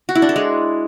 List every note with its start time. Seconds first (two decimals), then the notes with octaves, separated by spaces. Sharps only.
0.09 F#4
0.15 E4
0.22 D4
0.29 A4
0.36 G#3